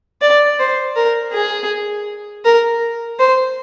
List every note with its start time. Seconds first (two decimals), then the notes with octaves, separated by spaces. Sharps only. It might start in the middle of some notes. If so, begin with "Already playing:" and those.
0.22 D5
0.59 C5
0.96 A#4
1.33 G#4
2.45 A#4
3.19 C5